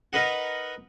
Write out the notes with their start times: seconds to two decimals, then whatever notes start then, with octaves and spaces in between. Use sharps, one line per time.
0.13 D#4 A#4 B4 D#5 F#5